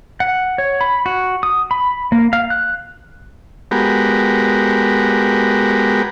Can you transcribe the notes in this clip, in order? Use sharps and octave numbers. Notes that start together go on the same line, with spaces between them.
F#5
C#5
B5
F#4
D#6
B5
A#3
F5
F#6
G#3 B3 F#4 G4 A#4